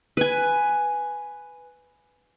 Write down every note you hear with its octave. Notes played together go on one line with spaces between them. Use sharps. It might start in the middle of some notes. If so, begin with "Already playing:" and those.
B4 G#5